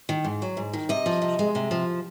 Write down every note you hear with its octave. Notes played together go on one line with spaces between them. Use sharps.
D#3
G#2
F#3
G#2
D#3
C3 D#5
F3
C3
G#3
C3
F3